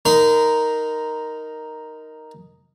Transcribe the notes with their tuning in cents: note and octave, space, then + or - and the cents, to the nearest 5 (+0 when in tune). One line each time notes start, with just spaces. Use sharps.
D#4 +0 A#4 +0 C6 -40